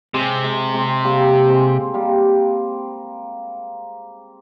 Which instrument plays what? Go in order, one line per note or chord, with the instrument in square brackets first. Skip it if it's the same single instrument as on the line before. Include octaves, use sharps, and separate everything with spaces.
[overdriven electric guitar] C3 [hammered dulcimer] G#3 C4
[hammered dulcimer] G#3 C4
G#3 C4
G3 A#3
G#3 C4
G3 A#3